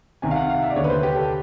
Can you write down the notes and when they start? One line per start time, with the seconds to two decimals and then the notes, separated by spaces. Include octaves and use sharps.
0.22 C2 C3 D#3 G#5
0.31 F5
0.36 F#5
0.49 F5
0.62 E5
0.70 D5
0.76 D#2 D3 C#5
0.84 B4
0.90 C5
1.03 G4
1.16 A4